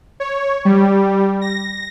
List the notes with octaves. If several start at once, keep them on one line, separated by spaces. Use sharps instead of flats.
C#5
G3
A#6